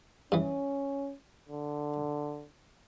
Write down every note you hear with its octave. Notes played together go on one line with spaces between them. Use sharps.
G2 E3 C#4
D3